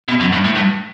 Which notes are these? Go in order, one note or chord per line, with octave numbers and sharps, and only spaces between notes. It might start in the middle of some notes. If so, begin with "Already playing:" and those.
B2
F#2
G2
A2
G2